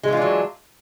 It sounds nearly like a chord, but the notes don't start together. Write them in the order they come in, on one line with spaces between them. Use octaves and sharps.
G#3 E3 F4 D4 F#3